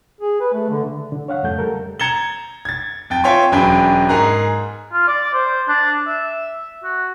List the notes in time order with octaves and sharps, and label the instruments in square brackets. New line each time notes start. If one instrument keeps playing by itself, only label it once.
[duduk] G#4
B4
A3
D3
[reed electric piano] D3
C#5 F5 F#5
F2 C#3 G3 A3 G6
G3 A4 A#4
[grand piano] A#5 G#6 A6 C#7 E7 G7
G#6 A6
F2 G5 A6
F4 C#5 E5 G5 G#5 C6
E1 F#2 D4 G5 G#5 B5
G#2 G#4 A#4 A#5 F#6
[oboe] F4
D5
C5
D4
E5
F#4